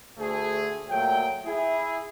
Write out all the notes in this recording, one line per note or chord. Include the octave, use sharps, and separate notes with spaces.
D2 A3 G#4
A#2 F#3 A3 G5
E4 G#4